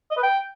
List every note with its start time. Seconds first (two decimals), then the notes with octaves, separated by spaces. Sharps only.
0.11 D#5
0.17 B4
0.23 G5